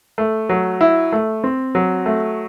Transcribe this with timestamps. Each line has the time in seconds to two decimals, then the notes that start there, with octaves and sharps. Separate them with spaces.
0.18 A3
0.49 F#3
0.81 E4
1.12 A3
1.44 C4
1.75 F#3
2.06 A3